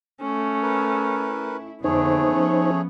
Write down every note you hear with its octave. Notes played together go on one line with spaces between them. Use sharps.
A3 C#4
A#4 B4
E4
F2 D3 A3 B3 D#4 G#4 C5 C#5
F3 C#4